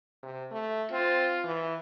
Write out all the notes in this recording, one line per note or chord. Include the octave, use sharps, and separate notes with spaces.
C3
A3
C4 F4
E3